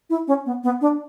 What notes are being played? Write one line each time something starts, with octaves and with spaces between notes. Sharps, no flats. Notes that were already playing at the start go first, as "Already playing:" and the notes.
E4
C#4
B3
B3
D4